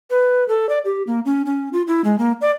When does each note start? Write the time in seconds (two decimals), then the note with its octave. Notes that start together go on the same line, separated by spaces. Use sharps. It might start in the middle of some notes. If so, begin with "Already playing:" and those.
0.10 B4
0.48 A4
0.69 D5
0.85 G4
1.07 A#3
1.26 C#4
1.46 C#4
1.73 F4
1.88 E4
2.04 G#3
2.19 A#3
2.41 D5